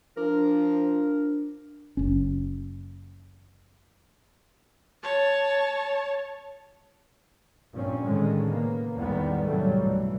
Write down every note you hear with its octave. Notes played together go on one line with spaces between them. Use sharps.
F3 D4 A#4
F#1 C#4
C#5 A5
G2 A#2 F3 C4 C#4
A2 D3 D#3 G#3 C#4
C#3 A#3 B3
E2 A2 D#3 G3 G#3 B3
A2 C3 F#3 G3 A3
B1 G2 E3